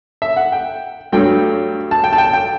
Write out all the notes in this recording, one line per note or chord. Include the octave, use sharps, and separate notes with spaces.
E5
F#5
G5
G2 F#3 A3 G5
A5
G5
A5
G5
G5